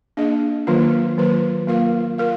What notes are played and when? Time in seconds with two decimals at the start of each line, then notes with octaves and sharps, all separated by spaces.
0.17 A#3 D4 G#4 D#5
0.67 D#3 F#3 A#3 F4 B4
1.18 D#3 F#3 A#3 F4 B4
1.67 A#3 F4 A#4 F5
2.18 F4 A#4 F5